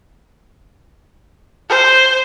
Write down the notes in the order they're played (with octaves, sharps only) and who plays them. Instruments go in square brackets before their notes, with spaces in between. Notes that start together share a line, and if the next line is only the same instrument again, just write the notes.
[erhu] C5